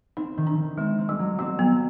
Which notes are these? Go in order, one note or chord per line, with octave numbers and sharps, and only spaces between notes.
C4 D#4
D#3
D4
D#3
G#3 C4
C4
G3
F#3
G3 C4
F#3 B3